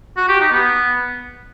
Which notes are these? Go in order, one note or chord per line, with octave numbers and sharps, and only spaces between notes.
F#4
G4
D#4
B3